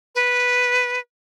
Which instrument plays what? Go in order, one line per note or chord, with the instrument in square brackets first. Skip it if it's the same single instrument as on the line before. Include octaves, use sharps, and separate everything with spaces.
[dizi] B4